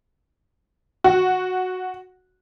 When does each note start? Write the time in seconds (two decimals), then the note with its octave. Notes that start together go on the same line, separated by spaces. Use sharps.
1.04 F#4